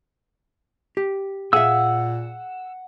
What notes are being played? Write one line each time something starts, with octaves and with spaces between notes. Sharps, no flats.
G4
A#2 G#4 E5 F#5 E6